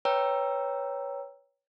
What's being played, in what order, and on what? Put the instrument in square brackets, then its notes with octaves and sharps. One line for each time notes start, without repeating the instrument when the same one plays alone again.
[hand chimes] B4 C#5 G5 A#5 E6